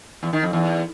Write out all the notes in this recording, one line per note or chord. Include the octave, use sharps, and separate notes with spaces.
E2
D#3
F2
E2